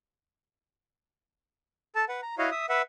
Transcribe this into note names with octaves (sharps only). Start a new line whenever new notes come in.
A4 A5
B4 F#5
A#5
E4 F#4 C#5 D#5 F5
E5 D#6
B4 E5 F#5